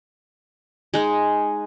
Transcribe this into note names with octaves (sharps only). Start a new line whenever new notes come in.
G#3 D#4